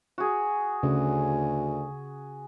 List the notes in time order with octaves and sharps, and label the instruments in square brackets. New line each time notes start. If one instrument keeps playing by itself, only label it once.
[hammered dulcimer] F#4 G#4
[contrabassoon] D2 [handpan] C#3